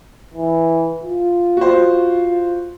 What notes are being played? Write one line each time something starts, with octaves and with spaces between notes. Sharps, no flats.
E3
F4
F#4 C5